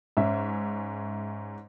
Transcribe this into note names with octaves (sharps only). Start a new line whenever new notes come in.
G#2 C#4 E5